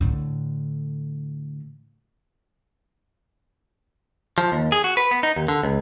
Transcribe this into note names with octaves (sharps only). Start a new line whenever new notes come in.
A2 D3
F3
D#2
G#4
F#4
B4
B3
D#4
D#2
D3
C#2